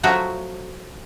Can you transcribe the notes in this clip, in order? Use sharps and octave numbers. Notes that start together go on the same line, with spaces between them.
F3 F#3 A3 F#4